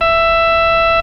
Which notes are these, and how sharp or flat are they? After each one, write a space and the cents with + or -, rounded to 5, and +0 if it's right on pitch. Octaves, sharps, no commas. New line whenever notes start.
E5 +10